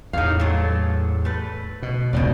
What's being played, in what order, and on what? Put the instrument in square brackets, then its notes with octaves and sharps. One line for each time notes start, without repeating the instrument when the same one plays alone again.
[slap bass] E2 A2 [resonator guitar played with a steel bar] D#4 F5
[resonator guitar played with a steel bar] F#3 A3
A3 B4
[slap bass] B2
[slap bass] E1 C#2 [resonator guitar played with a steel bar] B2 D#4 D5